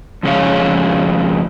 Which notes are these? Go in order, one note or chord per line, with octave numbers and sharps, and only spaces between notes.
F2 C#3 G#3 C#5 F5